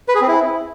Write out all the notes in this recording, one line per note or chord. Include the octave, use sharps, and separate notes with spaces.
B4
G#4
C4
E4